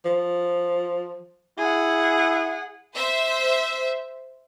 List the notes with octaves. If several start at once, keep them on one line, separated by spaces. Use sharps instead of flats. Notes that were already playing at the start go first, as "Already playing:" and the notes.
F3
E4 G#4 F#5
C5 E5